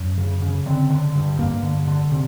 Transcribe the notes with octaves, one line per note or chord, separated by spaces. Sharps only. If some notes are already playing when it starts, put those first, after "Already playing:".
Already playing: F#2
C#3
C#3
D3 C4
D3
G2
G2 A#3
D3
D3
C3